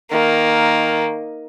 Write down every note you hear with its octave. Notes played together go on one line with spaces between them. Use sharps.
D#3 A#3